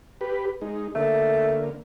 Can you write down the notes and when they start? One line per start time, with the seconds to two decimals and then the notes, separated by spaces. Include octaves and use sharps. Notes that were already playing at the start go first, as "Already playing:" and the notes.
0.21 G4 B4
0.61 G#3 D#4
0.95 D3 A3 A#3